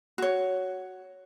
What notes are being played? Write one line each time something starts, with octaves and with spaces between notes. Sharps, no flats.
F#4 C#5